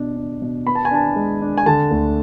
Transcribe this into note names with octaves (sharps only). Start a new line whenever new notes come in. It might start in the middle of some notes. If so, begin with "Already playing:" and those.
Already playing: B2 D4
D4
B2
B3 B5
A5
G#5
D4 A5
G#3
D4
G#5
D3 A5
D2